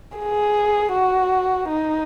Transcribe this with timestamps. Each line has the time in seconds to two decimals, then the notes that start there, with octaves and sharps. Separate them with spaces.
0.17 G#4
0.92 F#4
1.68 D#4